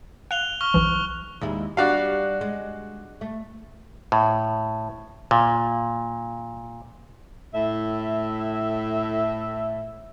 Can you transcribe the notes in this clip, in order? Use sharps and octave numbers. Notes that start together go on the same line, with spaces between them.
F5 F#6 F7 G7
C#6 F6 G7
B1 E3
D#2 G#3 E4
G3 D4 F#4 F5
G#3
A3
A2
A#2
A2 E5